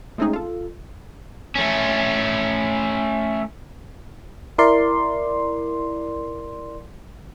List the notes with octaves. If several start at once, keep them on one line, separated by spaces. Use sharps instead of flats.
G#3 A3 C4 C#4 D#4 G#4
F4 A4
A3 C#4
E4 A#4 D5 C6